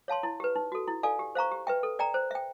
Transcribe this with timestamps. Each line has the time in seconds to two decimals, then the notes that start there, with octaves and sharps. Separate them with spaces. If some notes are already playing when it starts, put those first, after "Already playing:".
0.08 C#5 F5 A5 C6
0.23 E4
0.40 G4 B4
0.56 D#4
0.72 F#4 A4
0.88 E4
1.03 A4 D5 F5 G#5
1.19 G4
1.35 C5 F5 A#5 C#6
1.51 G4
1.67 B4 E5 G5
1.83 A4
1.99 D5 G5 A#5
2.14 C5
2.31 E5 G5